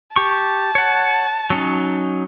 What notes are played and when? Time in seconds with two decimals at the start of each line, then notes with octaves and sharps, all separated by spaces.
0.16 G4 A5 C#6
0.75 C#5 F#5
1.50 F#3 C#4 D#4